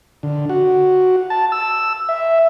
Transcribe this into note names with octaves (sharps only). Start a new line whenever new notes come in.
D3
F#4
A5
E6
E5